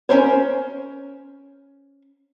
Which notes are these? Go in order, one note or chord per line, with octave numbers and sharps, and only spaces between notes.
C#4 E4 A#4 C5 C#5